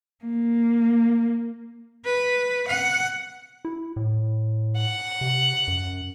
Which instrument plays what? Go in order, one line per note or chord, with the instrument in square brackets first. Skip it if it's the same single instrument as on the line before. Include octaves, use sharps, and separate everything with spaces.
[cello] A#3
B4
F#5
[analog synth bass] E4
A2
[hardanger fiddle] F#5
[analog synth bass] C3
F#2